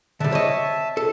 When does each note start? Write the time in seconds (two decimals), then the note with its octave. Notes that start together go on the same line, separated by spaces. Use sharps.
0.20 D3 G3 E5 A5
0.32 C#5 D#5
0.97 A4